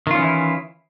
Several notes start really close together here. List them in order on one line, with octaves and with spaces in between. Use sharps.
D#3 F4 C#4 E3 E4